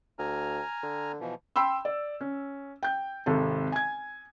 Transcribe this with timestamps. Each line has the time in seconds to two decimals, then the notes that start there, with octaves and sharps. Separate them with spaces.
0.19 D2 G#5 A#5 F6
0.83 D3
1.20 B2 E3 F3
1.56 G5 B5 C6 E6
1.85 D5
2.21 C#4
2.83 G5 G6
3.26 G#1 C3 A4
3.72 G#5 G#6